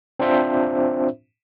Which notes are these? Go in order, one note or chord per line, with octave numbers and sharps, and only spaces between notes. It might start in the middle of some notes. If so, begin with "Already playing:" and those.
C4 D4 F4 C5 E5